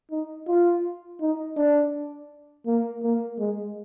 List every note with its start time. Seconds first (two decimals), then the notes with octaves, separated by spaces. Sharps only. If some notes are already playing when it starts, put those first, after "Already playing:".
0.11 D#4
0.48 F4
1.21 D#4
1.57 D4
2.67 A#3
3.03 A#3
3.39 G#3